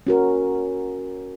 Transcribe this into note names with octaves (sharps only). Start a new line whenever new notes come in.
C#4 F#4 A#4